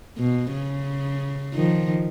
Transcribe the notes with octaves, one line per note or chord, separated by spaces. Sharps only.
B2
C#3
D#3 F3